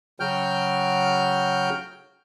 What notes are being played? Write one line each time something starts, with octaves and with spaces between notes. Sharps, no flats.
C#3 F#3 F#4 G5 F6 G6